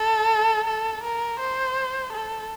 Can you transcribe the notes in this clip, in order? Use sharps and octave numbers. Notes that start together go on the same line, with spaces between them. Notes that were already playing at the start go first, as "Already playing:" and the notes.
Already playing: A4
A4
A#4
C5
A4